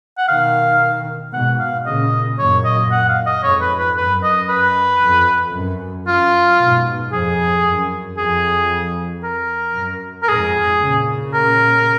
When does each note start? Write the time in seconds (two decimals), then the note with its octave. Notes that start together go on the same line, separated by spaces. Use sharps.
0.18 F#5
0.27 B2 D#3 F5
1.33 G#2 B2 F#5
1.59 F5
1.86 A#2 C#3 D#5
2.38 F#2 A#2 C#5
2.65 D#5
2.92 F#5
3.09 F5
3.26 D#5
3.43 F2 G#2 C#5
3.61 B4
3.79 B4
3.97 F#2 B4
4.23 D#5
4.49 B4
5.02 F2
5.54 F#2
6.07 F#2 F4
6.59 G#2 B2
7.12 F2 G#4
7.65 F#2
8.17 F2 G#4
9.23 A#4
9.76 F#2
10.23 A#4
10.28 F2 G#2 G#4
10.81 A#2 C#3
11.34 A#4